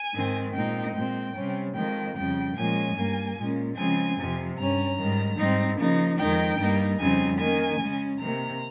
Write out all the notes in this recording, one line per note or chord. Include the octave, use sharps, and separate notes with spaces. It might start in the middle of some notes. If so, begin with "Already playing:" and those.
Already playing: G#5
G#2 D#3 G#3 C4
A#2 G#3 C4 D#4 G5
A#2 G#3 C4 G5
C3 G3 C#4
F2 D#3 G#3 G5
F2 C#3 G3 G5
A#2 F3 G#3 C#4 G#5
G2 G3 A#3
A#2 G#3 C#4
C#3 F3 G#3 C4 G#5
F2 C3 F3
G2 G3 C#4 A#5
G#2 D#3 G3
G#2 G3 C4 D#4
C#3 F3 A#3 D#4
F2 D#3 G#3 D#4 G5
G2 G3 A#3 D#4
F2 C#3 G3 C4 D#4 G#5
D#3 A#3 C#4 G#5
C#3 G#3 C#4
C3 D#3 A#3 A#5